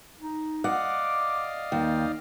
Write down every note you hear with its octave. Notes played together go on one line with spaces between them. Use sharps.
D#4
D5 D#5 F5 F#5 D6
D#2 G5